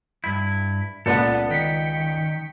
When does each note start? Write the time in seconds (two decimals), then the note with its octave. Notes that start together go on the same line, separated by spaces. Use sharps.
0.24 G2 E4
1.06 C#2 A#2 B3 A4 B4 D5
1.50 D#3 G5 B6 C#7